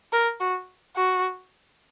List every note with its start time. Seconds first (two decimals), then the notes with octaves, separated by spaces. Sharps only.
0.13 A#4
0.40 F#4
0.96 F#4